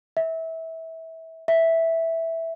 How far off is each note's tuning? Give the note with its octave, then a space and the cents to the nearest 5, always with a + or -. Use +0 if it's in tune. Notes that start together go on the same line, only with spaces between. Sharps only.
E5 -20
E5 -5